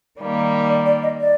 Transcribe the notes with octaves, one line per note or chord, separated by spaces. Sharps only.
D#3 G3 A#3
D5
D5
D#5
D5